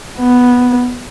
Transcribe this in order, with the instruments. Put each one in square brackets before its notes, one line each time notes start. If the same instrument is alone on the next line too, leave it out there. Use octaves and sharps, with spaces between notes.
[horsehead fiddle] B3